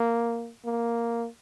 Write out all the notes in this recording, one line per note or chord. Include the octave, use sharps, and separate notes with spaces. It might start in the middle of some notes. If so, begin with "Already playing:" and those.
Already playing: A#3
A#3